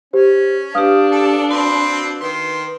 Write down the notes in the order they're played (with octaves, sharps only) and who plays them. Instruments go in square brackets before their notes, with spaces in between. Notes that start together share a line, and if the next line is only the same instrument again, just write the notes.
[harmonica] C#4 [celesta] G4 C5
[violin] D4 [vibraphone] G4 B4 [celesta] F5 D#6 F6
[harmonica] A4
[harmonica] C4 B4 C6 [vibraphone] F#4
[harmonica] D#3 C6 [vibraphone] B4